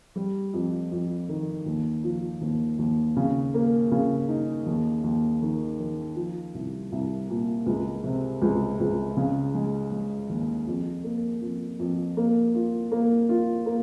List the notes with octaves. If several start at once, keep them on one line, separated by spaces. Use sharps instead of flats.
G3
F2
F2
D#3
D#2
F3
D#2
D#2
C#3
A#3
C#3
D#4
D#2
D#2
D#3
D#3
F3
C2
C2
A#2
C#2
C3
C#2
C#2
C#3
G#3
G#3
D#2
F2
A#3
F2
F2
A#3
F4
A#3
F4
A#3